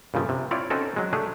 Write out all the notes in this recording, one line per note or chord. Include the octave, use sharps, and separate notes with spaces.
G2 A#2 C#3 F3 A3
C3
C4 E4 F4 C#5 D5
C4 C#4 D#4 F#4 A4
F#3 G#3
A3 D4 G4 G#4